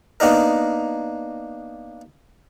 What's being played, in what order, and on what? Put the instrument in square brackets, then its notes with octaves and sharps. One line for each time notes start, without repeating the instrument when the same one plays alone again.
[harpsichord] A#3 B3 D4 D#4 A#4